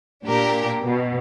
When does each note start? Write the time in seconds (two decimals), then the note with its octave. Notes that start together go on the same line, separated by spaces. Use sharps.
0.25 A#2 D4 G4 A#4
0.84 B2